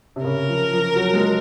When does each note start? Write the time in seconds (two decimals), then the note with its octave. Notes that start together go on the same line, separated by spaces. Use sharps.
0.16 C3
0.25 C#3 A#4
0.49 F3
0.72 F3
0.96 F#3
1.14 G#3